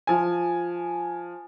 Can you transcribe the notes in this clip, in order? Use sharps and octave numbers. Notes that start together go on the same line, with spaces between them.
F3 G#5